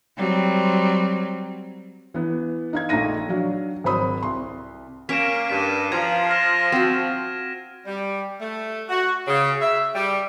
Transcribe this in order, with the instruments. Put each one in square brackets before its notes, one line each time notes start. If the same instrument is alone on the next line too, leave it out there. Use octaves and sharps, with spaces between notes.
[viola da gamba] F#3 G3 C4
[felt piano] E3 B3
D#4 F5 G#6
A#1 A3 D#4 F5 A#6 D#7
F#3 D4 F5
G#1 F#3 C5 B5 D#6
C2 C6
[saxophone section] A#3 [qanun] C#4 [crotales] B6 D7 E7
[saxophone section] G2 [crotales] B6 D#7
[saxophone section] F3 [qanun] A#5 [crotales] G#6
[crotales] F6 A#6 E7
[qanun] C4 F#4
[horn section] G3
A3
F#4
C#3
E5
G3